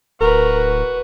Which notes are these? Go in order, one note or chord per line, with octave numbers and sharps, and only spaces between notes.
D1 F#4 A#4 B4